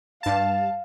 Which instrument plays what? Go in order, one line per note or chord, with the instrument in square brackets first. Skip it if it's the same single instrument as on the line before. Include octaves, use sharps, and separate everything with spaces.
[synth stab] G2 A5 [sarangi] F5